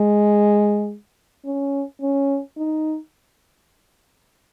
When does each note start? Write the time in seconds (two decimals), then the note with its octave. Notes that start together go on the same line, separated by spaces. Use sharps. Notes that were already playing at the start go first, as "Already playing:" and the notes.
Already playing: G#3
1.45 C#4
2.01 C#4
2.57 D#4